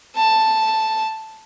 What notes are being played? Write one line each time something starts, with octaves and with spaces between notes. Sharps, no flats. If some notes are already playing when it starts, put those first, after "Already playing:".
A5